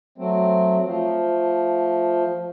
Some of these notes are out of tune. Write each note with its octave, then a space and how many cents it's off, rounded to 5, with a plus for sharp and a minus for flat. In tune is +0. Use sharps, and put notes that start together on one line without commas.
F#3 +0 A3 +0 C4 +5
F3 +0 A3 +0